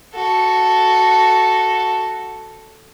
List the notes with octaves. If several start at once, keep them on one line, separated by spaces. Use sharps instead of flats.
F#4 A4